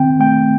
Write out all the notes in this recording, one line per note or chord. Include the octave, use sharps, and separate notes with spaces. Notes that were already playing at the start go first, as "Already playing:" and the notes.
Already playing: D#3 C4 G5
A3 G5